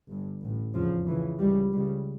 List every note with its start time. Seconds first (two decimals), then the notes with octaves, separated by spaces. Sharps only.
0.09 G1 G2
0.42 A1 A2
0.74 F1 E2 C#3 F3
1.07 C#2 C#3 E3
1.39 C#2 C#3 G3
1.72 C#2 C#3 G3